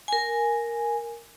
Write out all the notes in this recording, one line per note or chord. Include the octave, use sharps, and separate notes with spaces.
A#4 G#5